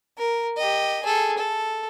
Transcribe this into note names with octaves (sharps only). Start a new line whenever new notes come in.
A#4
G4 D#5
G#4 A4
A4